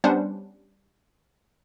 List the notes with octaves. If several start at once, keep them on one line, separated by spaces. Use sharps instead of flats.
G3 B3 C#4 D4 C5 F#5